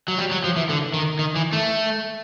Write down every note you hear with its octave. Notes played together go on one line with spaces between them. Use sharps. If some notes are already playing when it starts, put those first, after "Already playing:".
F#3
G3
F#3
F3
E3
D3
D#3
D#3
E3
A3